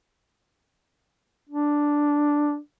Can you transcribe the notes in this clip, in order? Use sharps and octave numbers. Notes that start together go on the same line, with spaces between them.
D4